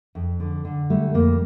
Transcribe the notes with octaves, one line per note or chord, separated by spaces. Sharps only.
F2
D3
D3
G3 A3
F2 A#3